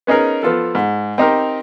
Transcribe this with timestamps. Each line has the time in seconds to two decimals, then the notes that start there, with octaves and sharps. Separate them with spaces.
0.07 B3 C#4 D#4 G#4 A#4
0.43 F3 B3 F4 A4
0.75 G#2
1.18 C4 D#4 G4 A#4